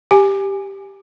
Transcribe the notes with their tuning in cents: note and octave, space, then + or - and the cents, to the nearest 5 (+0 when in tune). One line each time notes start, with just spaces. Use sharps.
G4 +0 G#5 +0